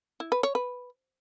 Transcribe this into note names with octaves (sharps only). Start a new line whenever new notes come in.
E4
B4
C#5
B4